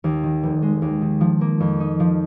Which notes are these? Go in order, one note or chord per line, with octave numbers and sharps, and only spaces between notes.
D#2
D#3
F1
G#3
D#2
D#3
F3
A#3
F2
D#4
F3